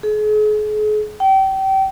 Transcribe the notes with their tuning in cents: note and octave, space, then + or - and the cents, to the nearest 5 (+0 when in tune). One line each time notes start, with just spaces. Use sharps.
G#4 +40
G5 -30